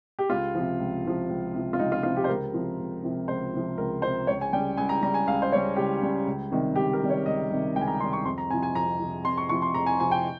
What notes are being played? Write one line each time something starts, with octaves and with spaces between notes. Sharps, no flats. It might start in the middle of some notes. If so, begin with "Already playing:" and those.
G4
C#2 F4
C3 F3
C#2
C3 F3
C#2
C3 F3
F4
C#2 D#4
F4
C3 F3 F4
G4
C5
C#2 A#4
C3 F3
C#2
C3 F3
C#2 C5
C3 F3
C#2 A#4
C3 F3 C5
C#2 C#5
G#5
C#3 G3 G5
C#2 G#5
A#5
C#3 G3 A#5
G#5
C#2 F5
C5
C#3 G3 C#5
C#2 G4
C#3 G3
C#2
C3 D#3 G3
C#2 G4
A#4
C3 D#3 G3
C#5
C#2 D#5
C3 D#3 G3
C#2 G5
G#5
A#5
C3 D#3 G3 C6
C#6
F2 C6
A#5
C3 F3 G#5
G#5
F2 A#5
C3 F3
F2 C6
C#6
C3 F3 C#6
C6
F2 A#5
G#5
C3 F3 G#5
G5